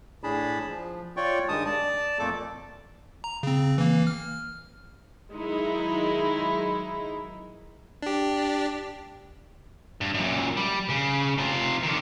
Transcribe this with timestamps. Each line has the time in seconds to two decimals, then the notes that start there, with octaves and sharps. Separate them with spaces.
0.23 A2 D4 G#4 A5 B5
0.68 F3
1.17 F4 C#5 D5 G5 C#6
1.48 G2 D#3 G#3 A5 D#6
1.66 D5 A5
2.19 F2 A#2 A3 A#3 A4 D6
3.24 A#5
3.43 C#3 C4
3.78 E3 A#3
4.07 F6
5.32 D#3 F#3 G#3 D#4 E4
8.02 D4 G4
10.01 G2
10.14 F#2 A#2
10.57 G3
10.90 C#3
11.38 C3 F4
11.83 D3 D#3